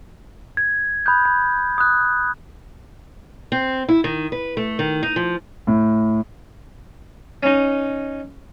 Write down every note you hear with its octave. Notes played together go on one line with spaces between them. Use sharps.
G#6
B5 D#6 F#6 G6
B5
D#6 F#6
C4
E4
D#3
B4
A3
D#3
D#4
F3
A2
C#4 D#4